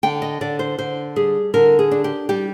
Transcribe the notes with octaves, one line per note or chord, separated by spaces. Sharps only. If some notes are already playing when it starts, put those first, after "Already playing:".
D3 G5
D#5
D3 D5
C5
D3 C5
G3 G#4
D3 A#4
G#4
D4
G4
G3 G4